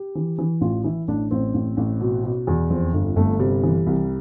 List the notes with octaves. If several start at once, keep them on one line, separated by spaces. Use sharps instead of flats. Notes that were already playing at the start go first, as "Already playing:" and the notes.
Already playing: G4
E3
E3
A1 F4
E3 E4
A1 D4
A1 C4
A1
A1
B2
B2
E2
F2 C4
G1
G1 A3
C3 G3
E3
C2